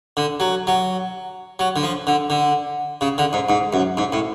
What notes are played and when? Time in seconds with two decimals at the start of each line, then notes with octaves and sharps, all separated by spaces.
0.17 D3
0.40 F#3
0.67 F#3
1.59 F#3
1.76 D3
1.83 F3
2.07 D3
2.30 D3
3.01 C#3
3.18 D3
3.33 G#2
3.49 G#2
3.73 F#2
3.97 G#2
4.12 A2